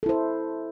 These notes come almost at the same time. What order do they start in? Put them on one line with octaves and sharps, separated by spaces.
A4 E4 C5